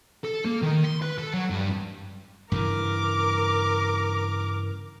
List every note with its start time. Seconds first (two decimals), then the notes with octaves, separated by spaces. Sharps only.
0.24 A4
0.45 A#3
0.62 D#3
0.84 C6
1.02 B4
1.18 A4
1.33 F#3
1.50 G2
2.52 G2 C#3 E3 A#4 D6